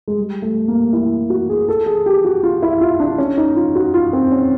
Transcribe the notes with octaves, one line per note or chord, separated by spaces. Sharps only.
G#3
G3
A3
A#3
E4
F#4
G#4
A4
G#4
G4
F#4
F4
E4
F4
D4
C#4
D#4
F4
F#4
F4
C4
C#4